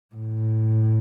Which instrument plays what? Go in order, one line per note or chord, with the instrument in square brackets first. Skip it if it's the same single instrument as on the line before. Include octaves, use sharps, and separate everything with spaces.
[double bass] A2